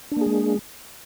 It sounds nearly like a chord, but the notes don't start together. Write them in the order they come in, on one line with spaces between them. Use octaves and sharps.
D4 A#3 G#4 G#3